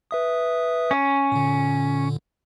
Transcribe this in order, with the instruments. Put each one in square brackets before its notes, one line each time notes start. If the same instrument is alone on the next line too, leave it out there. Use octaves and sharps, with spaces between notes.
[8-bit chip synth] B4 E5 D#6
[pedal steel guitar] C#4
[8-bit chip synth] A#2 D3